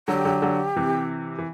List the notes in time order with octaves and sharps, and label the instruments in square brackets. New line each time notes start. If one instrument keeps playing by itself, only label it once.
[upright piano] D3 F#3 [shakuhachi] G4
[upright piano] D3 F#3
D3 F#3
C3 E3
E3